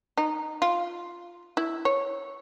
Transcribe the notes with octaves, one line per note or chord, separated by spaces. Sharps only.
D#4
F4
E4
C#5